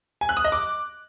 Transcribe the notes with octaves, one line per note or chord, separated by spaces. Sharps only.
G#5
F#6
D#6
D#5
D6